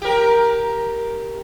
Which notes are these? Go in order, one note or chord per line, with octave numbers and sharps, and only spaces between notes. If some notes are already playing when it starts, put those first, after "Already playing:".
G4 A#4